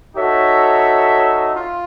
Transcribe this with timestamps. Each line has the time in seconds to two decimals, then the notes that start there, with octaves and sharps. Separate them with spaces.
0.16 D#4 F#4 A4 C#5 E5
1.56 F4